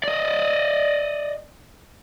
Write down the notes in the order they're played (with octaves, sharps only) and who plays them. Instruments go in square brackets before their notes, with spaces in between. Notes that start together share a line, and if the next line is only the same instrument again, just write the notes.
[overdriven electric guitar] D5 D#5